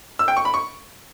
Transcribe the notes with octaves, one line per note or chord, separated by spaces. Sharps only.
E6
G5
C#6
B5
C#6